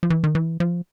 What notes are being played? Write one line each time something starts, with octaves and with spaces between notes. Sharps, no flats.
F3
E3
D#3
E3
F3